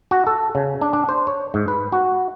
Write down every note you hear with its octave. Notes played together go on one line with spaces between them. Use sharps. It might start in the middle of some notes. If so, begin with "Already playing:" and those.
F#4
A4
C#3
D4
D4
C5
C#5
G#2
B4
F#4